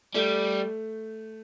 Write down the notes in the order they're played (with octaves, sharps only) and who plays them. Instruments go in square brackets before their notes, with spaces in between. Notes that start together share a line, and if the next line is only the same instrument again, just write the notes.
[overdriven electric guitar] G3 [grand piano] A3